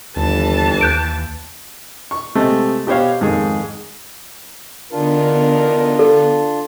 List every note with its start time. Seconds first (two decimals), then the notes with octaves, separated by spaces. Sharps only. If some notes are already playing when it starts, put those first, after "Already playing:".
0.16 G1 D#2 E3 A5
0.81 D#2 F#6 G6 D7
2.11 C#6
2.35 C3 G#3 A3 C4
2.87 B2 G4 C5 C#5 F5
3.20 F2 G#2 D#3 G#4
4.92 E2 D3 B3 D4 D#4 F4 A#4
5.99 A4